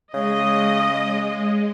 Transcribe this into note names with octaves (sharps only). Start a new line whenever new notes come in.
C#3 G#3 D#5